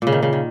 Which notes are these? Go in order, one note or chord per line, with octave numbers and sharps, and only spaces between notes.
A#2 C#3
D#3
C#3
D#3